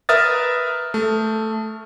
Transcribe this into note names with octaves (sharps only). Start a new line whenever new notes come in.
A#4 B4 E5 D#6 F6 A6
A3